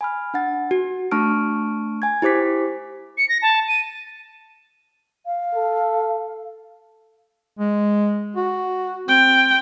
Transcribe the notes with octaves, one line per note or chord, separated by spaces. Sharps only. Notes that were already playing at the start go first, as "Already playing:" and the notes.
G#5 B5 F6
D4 F#5 A6
F#4
A3 D4 A5 C#6 F6 D7
G#5 G#6
E4 G4 C5 D6 B6
C#7
A#6
A5
D#7
F5
A4
G#3
F#4
C4 G5